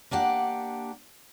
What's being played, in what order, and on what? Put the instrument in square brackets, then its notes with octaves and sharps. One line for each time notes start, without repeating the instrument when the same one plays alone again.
[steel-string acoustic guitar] A#3 D4 G4 F#5